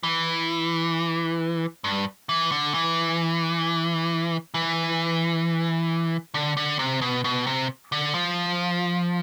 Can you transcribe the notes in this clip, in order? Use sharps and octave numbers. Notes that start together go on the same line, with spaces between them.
E3
G2
E3
D3
E3
E3
D3
D3
C3
B2
B2
C3
D3
F3